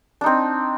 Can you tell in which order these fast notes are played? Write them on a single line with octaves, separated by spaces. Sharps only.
D4 D#4 C4